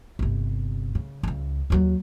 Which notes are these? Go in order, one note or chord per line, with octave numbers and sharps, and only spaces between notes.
G1 C3
C#3
C#2 C#3
D#2 F#3